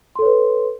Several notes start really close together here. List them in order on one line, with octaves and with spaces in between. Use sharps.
C6 A4 C#5 B4